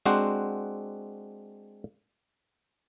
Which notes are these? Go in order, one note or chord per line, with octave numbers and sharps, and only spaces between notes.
G#3 C4 D4 F#4 C5 F#5